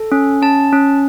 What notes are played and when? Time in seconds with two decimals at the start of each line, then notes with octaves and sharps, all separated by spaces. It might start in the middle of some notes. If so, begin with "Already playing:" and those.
Already playing: A4
0.12 C#4
0.42 C#4 A5
0.73 C#4